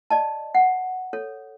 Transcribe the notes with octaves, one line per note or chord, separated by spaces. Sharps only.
D5 D#5 A5
F#5
A4 C#5